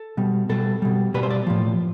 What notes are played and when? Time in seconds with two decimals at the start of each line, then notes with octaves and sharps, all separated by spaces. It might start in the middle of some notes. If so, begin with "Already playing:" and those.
Already playing: A4
0.17 B2 G3
0.49 B2 G3 A4
0.82 B2 G3
1.14 B2 G3 B4
1.23 C5
1.30 D5
1.47 A2 F3